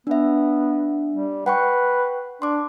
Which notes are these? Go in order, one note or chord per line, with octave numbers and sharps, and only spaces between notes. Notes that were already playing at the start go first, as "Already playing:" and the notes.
B3 D4 E5
G3
B4 F#5 G5 C#6
D4 C6 D6